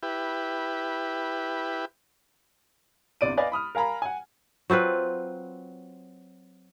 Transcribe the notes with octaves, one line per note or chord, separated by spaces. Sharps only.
E4 G4 B4
G1 C2 D5 D7 D#7
B4 D5 D#5 F5 G#5
B5 D#6 F6
A#4 F5 G#5 A#5 B5
F#5 G#5
F#3 C4 F4 B4